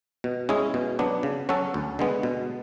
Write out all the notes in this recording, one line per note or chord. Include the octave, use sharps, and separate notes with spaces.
B2
G#3 C#4 E4 G#4
B2
F#3 B3 D4
C#3
F#3 C#4 F#4 A4
D2
D3 G#3 B3
B2